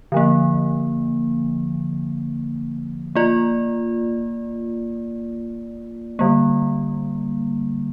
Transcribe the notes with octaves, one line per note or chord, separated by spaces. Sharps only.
D3 F3 A#3
A#3 F4 D5
D3 G3 A#3